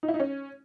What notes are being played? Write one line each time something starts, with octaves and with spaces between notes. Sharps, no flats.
D#4
E4
D#4
C#4